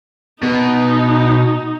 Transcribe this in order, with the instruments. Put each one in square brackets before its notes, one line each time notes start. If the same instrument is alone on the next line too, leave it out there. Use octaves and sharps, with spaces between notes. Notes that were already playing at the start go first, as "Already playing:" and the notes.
[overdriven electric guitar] B2 [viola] D#4